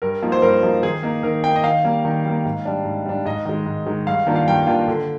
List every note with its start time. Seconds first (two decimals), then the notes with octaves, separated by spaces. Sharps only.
0.02 G2 A#4
0.22 F3 A#3 D#4
0.32 C5
0.42 G2 A#4
0.63 F3 A#3 D#4
0.83 D#3 G#4
1.03 A#3 D#4
1.23 D#3 A#4
1.44 A#3 D#4 G5
1.56 D#5
1.64 D#3 F5
1.84 G3 A#3
2.05 D#3
2.25 G3 A#3
2.45 G#2
2.65 G3 D4
2.85 G#2
3.06 G3 D4
3.26 G#2 D#5
3.45 D#3 G#3
3.66 G#2
3.86 D#3 G#3
4.07 G2 F5
4.27 D#3 A#3 D4 F4
4.36 F5
4.48 G2 G5
4.67 D#3 A#3 D4 F4
4.88 D3